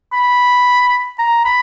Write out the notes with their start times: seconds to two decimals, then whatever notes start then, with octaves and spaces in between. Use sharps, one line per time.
0.12 B5
1.19 A#5
1.45 B5